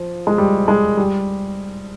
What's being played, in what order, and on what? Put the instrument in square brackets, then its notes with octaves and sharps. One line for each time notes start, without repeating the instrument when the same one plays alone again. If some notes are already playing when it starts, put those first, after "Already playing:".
Already playing: [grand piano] F3
G#3
G3
G#3
G3